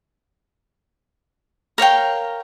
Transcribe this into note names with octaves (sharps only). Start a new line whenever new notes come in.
A#4 C#5 F5 G5